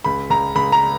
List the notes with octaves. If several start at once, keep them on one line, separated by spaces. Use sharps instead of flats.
C#2 B5
C#2 A#5
C#2 B5
A#5